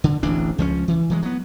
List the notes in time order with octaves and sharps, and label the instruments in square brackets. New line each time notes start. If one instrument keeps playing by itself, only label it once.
[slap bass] D3
D1 A1 E3 D4
C#2 F3 G3 C#4
E3
E3 F#3 G#3
F#3 B3